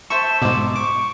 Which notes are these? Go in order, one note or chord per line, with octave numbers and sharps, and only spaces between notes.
C5 E5 A5 C#6 E7
G#2 B2 D6
C#6 D6